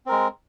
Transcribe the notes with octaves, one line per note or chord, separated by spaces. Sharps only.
G#3 C4 A#4